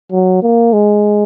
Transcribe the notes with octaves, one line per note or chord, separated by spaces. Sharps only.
F#3
A#3
G#3